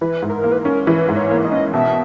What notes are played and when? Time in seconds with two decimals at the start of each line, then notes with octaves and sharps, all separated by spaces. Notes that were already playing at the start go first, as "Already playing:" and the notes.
0.01 E3 B4
0.22 G#2
0.30 A#4
0.44 A#3
0.52 B4
0.58 A#4
0.65 C#4
0.86 E3 B4
1.09 G#2
1.16 C#5
1.30 A#3
1.44 D#5
1.52 C#4
1.73 B2 E5